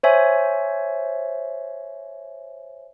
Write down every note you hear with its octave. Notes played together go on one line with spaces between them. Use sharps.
C5 C#5 E5 G#5